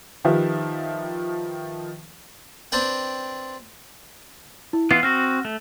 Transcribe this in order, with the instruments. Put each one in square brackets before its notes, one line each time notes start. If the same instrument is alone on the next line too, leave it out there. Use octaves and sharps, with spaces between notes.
[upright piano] D#3 F3 G4 B4 E5
[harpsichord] C4 D4 B4 G5
[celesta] E4
[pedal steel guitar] E3 B3 F4 [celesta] C7
[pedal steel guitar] C4 F#4 [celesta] F6 A#6
[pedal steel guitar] A3